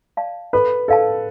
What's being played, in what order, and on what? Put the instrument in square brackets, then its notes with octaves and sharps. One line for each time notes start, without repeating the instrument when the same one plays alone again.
[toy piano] D5 F5 A5
[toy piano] A4 [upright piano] B4
[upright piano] A4 [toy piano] D5 F5 A5